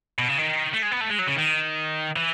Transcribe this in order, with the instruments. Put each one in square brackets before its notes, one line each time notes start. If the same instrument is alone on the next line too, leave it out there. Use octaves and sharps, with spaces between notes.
[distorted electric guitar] B2
C#3
D#3
A3
G#3
B3
A3
G#3
F#3
C#3
D#3
E3